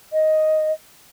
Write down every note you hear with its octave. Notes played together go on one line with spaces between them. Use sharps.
D#5